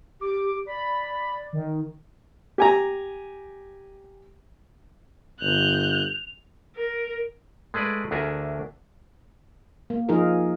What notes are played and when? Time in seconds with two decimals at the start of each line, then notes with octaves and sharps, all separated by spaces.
0.21 G4 D6
0.67 D5 B5
1.53 D#3
2.58 G4 G#5 A#5
5.41 G1 F#6 G6 F7
6.76 A#4
7.74 G#3 A3 G#4 B4 D5
8.11 D2 A3 D4 G#4 A#4 E5
9.90 A#3
10.09 F3 D#4 F4 G#4 A#4